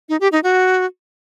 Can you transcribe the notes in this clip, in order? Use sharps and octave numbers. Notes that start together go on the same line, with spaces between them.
D#4
G4
D#4
F#4